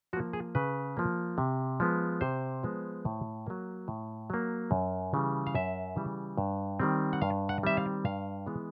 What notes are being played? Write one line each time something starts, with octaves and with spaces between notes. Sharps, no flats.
F3 A#3 F#4
G#4
C#3 B4
F3 A#3
C3
F3 G#3 B3
C3 C5
F3 G#3 B3
A2
F#3 A#3
A2
F#3 A#3
F#2
C#3 E3 G3
F5
F#2 E5
C#3 E3 G3
G2
D#3 G3 C4
F#5
G2 F5
F#5
D#3 G3 C4 E5
F5
G2 F5
E3 G#3 B3